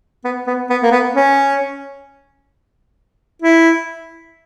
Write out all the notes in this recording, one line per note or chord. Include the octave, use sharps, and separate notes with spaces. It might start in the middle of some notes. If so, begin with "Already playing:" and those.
B3
B3
B3
A#3
B3
C#4
E4